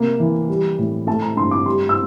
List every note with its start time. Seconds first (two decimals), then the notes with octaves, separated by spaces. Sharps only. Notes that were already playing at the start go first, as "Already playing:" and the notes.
Already playing: C3 A#3
0.20 E3
0.49 G3
0.78 A2
1.07 A3 A5
1.22 A#5
1.36 G2 C6
1.51 D6
1.66 G3 C6
1.89 E6